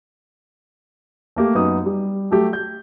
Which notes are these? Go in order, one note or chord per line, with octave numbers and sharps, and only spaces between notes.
A3 A#3 G4
F#2 B3 D#4 D#6
G3
F#3 A3 G4
G6